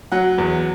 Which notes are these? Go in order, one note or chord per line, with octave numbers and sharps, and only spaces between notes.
F#3 F#5
E2